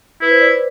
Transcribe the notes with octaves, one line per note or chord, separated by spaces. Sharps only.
E4 B4
C5
D5